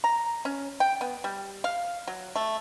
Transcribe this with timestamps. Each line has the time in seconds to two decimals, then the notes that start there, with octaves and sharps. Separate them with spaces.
0.04 A#5
0.45 C#4
0.80 G5
1.01 B3
1.24 G3
1.64 F5
2.07 F#3
2.36 A3